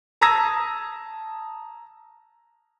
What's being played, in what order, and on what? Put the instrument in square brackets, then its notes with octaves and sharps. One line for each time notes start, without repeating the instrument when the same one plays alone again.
[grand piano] A5 A#5 D#6 E6 G#6 A#6